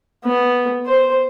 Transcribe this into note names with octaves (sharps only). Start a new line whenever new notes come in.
B3
C5